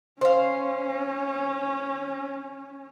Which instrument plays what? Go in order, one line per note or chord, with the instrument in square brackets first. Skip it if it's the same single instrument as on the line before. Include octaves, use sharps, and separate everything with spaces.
[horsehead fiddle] C#4 [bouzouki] C5 F5